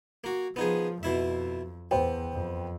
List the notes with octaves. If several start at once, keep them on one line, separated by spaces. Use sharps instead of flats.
A#3 F#4
F3 B3 D#4 G#4
F2 B2 E4 E5
E2 B3 C5 G5
F2